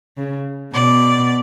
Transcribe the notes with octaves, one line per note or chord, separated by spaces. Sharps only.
C#3
B2 D5